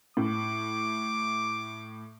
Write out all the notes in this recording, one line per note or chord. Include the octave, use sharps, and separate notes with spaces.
A2 D6